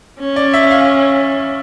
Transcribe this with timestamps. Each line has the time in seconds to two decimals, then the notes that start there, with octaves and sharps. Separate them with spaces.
0.19 C#4
0.36 D5
0.54 E5
0.71 F5